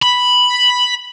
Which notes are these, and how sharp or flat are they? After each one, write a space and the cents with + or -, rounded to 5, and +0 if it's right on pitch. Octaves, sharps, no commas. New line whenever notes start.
B5 +0